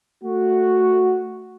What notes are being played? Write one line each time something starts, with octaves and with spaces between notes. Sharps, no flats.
A3 F#4